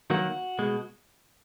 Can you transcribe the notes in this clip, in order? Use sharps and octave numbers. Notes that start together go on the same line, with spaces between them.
D#3 F#3 A#3 F#4
B2 G#3